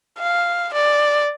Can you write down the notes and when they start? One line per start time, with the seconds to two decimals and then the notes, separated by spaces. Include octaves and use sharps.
0.19 F5
0.73 D5